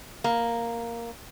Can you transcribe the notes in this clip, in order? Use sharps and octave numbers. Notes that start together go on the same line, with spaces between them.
A#3